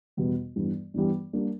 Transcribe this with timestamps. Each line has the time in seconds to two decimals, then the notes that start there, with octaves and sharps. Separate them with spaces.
0.17 E2 B2 G3 B3
0.56 G2 E3 G3 B3
0.94 G2 E3 G3 B3
1.33 G3 A#3 D4